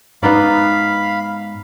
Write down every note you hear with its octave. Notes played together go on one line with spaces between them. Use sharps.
G#2 B3 D#4 D5 F5 B5